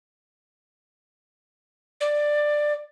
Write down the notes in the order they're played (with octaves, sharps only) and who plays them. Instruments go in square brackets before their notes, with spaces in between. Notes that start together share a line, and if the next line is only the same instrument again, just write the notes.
[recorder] D5